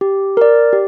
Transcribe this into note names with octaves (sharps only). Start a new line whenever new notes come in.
G4
A#4 D5
G4